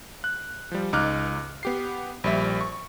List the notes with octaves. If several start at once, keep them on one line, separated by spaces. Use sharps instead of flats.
F#6
F3 G3
C#2 D#4 D6 F6 F#6
B3 G4 C7
A#1 G3 E5
C#6